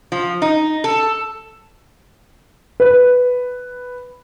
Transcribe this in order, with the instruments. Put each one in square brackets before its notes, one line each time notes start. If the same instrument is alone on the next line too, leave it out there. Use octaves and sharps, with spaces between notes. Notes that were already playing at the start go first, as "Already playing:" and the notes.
[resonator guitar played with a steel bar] F3
D#4
A4
[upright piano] B4